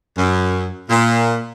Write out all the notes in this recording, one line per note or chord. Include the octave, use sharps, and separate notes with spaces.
F#2
A#2